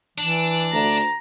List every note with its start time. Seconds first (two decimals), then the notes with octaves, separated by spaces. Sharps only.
0.18 E3 D4
0.73 D2 A#5